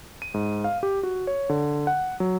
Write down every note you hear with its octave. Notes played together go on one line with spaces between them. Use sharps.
D#7
G#2
F5
G4
F#4
C#5
D3
F#5
F#3